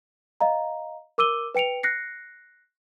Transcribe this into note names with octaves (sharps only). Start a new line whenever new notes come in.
D#5 F5 A#5
A#4 D6 E6 D#7 G7
B4 G5 C#7 D7 F7
F#6 A#6 C7 C#7